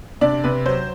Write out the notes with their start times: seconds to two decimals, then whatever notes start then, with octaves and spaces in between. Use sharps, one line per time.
0.21 C3 D4 D5
0.44 C3 B4
0.65 F#3 C5